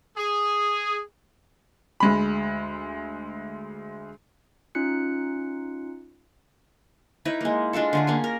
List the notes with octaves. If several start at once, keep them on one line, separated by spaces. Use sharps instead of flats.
G#4
D2 G#3 B5
C#4 D#4 F4 F#6 C#7
D#4 E4 B4 C#5
G#3 A#3
G#3 D4 F4 A4
D3 A3 G#4
A#3 C#4 G#5
A#4